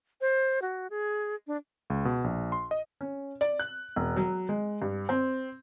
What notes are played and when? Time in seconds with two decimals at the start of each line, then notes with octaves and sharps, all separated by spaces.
0.21 C5
0.62 F#4
0.90 G#4
1.47 D4
1.90 C#2
2.05 B2
2.24 A#1
2.52 C6
2.71 D#5
3.01 C#4
3.41 D5
3.59 F#6
3.96 E1
4.16 F#3
4.49 G#3
4.82 G2
5.09 C4